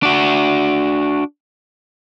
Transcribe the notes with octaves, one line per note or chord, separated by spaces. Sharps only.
D4 F#4